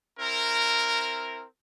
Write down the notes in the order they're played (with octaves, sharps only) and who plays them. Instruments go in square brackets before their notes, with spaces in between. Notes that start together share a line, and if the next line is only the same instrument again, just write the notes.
[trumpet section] C4 E4 A#4